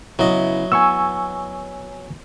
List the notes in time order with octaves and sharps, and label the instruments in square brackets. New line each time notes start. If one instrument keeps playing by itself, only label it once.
[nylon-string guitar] C#3 B3 E4 [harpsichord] F#3 D#5
[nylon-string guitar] B3 [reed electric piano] G#5 C#6 E6